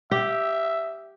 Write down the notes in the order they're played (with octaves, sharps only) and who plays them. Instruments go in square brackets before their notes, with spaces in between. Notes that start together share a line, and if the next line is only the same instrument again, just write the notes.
[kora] G4 [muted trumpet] E5